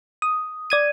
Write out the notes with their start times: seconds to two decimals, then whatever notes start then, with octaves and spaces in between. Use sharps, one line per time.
0.22 D#6
0.70 D5 G#6 D#7